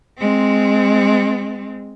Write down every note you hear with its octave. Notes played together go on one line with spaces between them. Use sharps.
G#3 C4